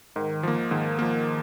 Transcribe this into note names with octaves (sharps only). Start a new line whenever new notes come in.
G#2 D#3
F3 A#3
G#2 D#3
F3 A#3